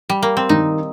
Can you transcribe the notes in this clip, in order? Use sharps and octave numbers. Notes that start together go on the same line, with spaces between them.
G3
A#3
C4
D#3 D#4